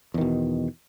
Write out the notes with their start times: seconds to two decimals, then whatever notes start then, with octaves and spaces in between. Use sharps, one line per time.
0.14 E2
0.18 D#3
0.21 B2